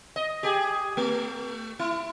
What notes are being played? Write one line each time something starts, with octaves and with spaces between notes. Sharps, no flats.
D#5
G4 G#4
A3
E4